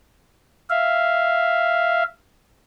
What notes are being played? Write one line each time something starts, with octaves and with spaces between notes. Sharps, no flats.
E5 F5